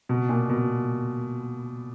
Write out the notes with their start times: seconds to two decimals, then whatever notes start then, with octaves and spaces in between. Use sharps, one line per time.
0.09 B2
0.29 A#2
0.50 B2